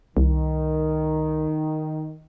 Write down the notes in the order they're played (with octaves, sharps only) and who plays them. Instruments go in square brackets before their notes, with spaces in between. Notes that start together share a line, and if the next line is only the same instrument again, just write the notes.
[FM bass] C2 [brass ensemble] D#3